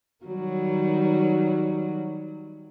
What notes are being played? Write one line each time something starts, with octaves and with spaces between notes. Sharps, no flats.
D#3 F#3 G3